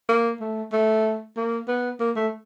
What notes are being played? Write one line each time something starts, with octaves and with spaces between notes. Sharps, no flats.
A#3
A3
A3
A#3
B3
A#3
A3